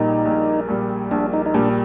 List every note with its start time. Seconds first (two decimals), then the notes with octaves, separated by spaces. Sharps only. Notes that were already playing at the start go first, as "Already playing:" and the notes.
Already playing: A#1 A#2 G3 D#4
0.25 A#1
0.68 A#2 G3
1.11 A#1 D4
1.33 D#4
1.46 D#4
1.54 A#2 G3 D4